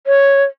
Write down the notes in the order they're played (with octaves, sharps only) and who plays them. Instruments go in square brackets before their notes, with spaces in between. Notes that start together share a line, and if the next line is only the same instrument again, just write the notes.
[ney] C#5